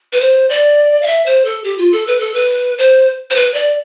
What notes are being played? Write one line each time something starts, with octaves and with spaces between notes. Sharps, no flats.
B4
C5
D5
F5
E5
C5
A4
G4
F4
A4
B4
A4
B4
C5
C5
B4
D5